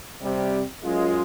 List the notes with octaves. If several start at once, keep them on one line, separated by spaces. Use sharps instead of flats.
C3 G3
F#2 G#3 F4